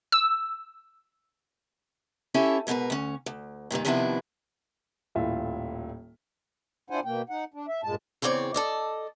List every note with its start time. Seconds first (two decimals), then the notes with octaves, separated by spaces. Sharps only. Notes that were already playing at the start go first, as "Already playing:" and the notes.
0.12 E6
2.34 C#4 E4 G4 A4
2.67 G#2 B2 F4 A#4 B4
2.90 D2 C#4
3.26 D2
3.71 G2 A#2 D3 D#3
3.85 C3 D#3 F3 B3 D4 E4
5.15 D#1 A2 E4 F4 E5
6.90 D4 E4 F4 C5 F#5 G#5
7.05 B2 A#3 G5
7.30 D#4 F#5
7.54 D4
7.68 E5
7.84 G2 A#2 G#3 A5
8.22 E2 C#3 C4 C#5 D5
8.54 A4 D5 D#5